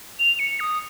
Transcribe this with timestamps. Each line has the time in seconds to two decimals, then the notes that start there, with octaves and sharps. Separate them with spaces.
0.19 F7
0.39 C#7
0.60 D#6